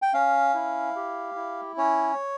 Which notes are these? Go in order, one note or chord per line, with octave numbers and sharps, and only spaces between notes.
G5
C#4 F5
E4
G4
E4
C#4 C#5